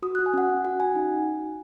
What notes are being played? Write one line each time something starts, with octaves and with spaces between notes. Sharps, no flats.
F#4 D#6
F#6
F#4
G#5
C#4 F#5
C#4
F#4 F#5
F#4 G#5
D#4